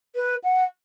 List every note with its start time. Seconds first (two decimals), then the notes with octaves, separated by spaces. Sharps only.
0.15 B4
0.44 F#5